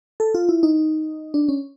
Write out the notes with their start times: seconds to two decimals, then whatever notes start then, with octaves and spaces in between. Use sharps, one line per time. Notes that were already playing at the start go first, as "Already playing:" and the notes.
0.20 A4
0.34 F4
0.49 E4
0.63 D#4
1.34 D4
1.49 C#4